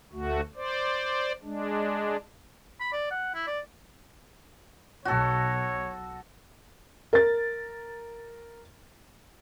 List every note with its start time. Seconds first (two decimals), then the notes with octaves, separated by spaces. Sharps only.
0.12 D2 A3 F#4
0.56 C5 D5
1.43 G#3 D4
2.80 B5
2.92 D5
3.11 F#5
3.35 E4
3.47 D5
5.05 B1 F#4 A4 C#5
7.13 A#4 A6